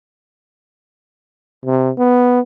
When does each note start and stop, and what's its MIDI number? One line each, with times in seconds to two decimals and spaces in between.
1.65 1.90 48
1.98 2.40 59